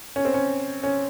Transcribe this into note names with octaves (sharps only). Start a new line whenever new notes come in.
C#4
C4
C#4
C#4